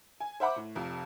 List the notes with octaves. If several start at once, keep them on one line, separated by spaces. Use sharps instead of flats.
G#5
C5 E5 F#5 B5 D6
A2
F1 F2